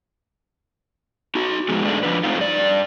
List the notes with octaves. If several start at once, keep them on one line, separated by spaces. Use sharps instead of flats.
D#4 F#4
A2 F3 G#3 B3 D#4 G#4
G#2 G#3 A3 D4
F2 F3 D4 B4
A3 C4 D#4 F4
G2 D5